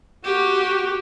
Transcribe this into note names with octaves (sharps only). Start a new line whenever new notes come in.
F#4 G4